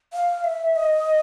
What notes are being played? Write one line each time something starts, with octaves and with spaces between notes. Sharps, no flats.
F5
E5
D#5